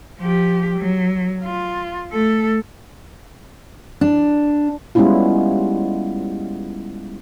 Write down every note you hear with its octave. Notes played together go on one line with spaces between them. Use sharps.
F3 G4
F#3
F4
A3 A4
D4
G3 G#3 B3 C#4 E4 F4